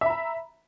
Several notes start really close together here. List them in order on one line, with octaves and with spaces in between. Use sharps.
E5 B5 A#5